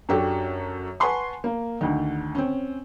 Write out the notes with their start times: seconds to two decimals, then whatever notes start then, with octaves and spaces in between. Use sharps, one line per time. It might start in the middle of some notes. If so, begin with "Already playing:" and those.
0.09 F#2 D4 F#4 G4 A4
1.00 B4 F#5 G#5 A5 C6 C#6
1.44 A#3
1.81 D2 D3 D#3
2.35 C4 C#4